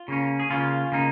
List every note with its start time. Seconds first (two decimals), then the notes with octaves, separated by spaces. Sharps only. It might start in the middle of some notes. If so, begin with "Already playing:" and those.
Already playing: F4
0.08 C#3 A#3 C#4
0.40 G#4
0.50 C#3 A#3 C#4 F4
0.92 C#3 A#3 D#4